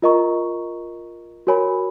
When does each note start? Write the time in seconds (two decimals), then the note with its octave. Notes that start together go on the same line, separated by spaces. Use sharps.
0.02 F4 A#4 D#5 A#5 C#6
1.47 F#4 A#4 C#5 G#5 B5